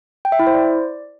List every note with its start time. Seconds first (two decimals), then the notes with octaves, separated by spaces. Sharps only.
0.25 G5
0.32 E5
0.39 E4
0.47 C5
0.54 D5